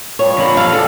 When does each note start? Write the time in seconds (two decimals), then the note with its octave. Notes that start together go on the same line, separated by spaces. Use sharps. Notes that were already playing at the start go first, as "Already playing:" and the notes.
0.19 F3 G3 C#5
0.38 F2 A#2 D3 A#3 B5
0.57 G3 A4 F5
0.73 G#3 E4 G4 A4